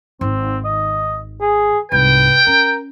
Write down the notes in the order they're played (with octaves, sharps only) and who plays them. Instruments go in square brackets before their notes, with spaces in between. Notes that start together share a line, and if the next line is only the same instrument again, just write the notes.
[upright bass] G#1 D#3 [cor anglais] C4
[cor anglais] D#5
G#4
[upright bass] C2 G#2 [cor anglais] B4 [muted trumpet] G5
[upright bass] C#4 [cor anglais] A#4